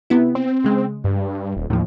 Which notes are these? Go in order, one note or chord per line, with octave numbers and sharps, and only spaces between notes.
C3 B3 E4
C4
C#3 G#3
G2
D#1
D#2 A2 F3